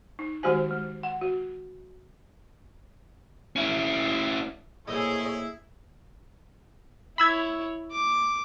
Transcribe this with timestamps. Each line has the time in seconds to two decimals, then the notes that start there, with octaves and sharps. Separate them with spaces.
0.19 D#4
0.43 D#3 G#3 F#4 G4 C5 G#5
0.71 G#3
1.03 F#5
1.21 F#4
3.56 C#4 E4
4.88 A#1 A2 C3 E4 G#4 C#5 D#5
7.18 E4 C#5 B5 E6 G#6
7.91 D6